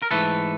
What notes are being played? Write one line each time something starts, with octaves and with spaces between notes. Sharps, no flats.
A#4
G#2 E3 A3 A4 B4